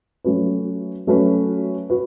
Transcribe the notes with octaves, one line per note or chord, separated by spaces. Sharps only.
F#3 A3 C#4 F#4 B4
F#3 A3 C#4 F#4 B4
F#4 B4